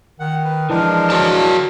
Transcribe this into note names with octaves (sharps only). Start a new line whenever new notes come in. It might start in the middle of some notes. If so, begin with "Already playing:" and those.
D#3 F#5
B4
E3 F3 G#3 D4 A#4
F#4 C#5 A5